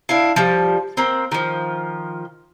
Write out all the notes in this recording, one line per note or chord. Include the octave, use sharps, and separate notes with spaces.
D4 E4 F5
F3 G3
A#3 C4
D#3 F3